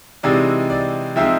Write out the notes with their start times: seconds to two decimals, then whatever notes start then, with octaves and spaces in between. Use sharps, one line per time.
0.23 C3 E3 G#3 C4 D#4 D5
0.70 D5
1.16 F3 G#3 C4 D#4 E5